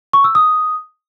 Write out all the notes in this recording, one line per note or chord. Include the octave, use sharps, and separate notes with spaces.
C#6
E6
D#6